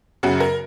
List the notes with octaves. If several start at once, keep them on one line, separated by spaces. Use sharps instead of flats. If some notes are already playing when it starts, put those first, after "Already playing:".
F#2 C#3 F#4
A#4